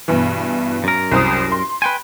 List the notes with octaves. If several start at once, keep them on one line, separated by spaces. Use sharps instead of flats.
G2 B2 E3
F#2 A#4
C2 C5 D#6
C6
B4 G5 G#5